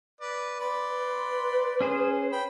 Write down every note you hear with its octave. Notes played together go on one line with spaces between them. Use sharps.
B4 D5
B4 D5 B5 C6
C#4 G#4 C5
G5 B5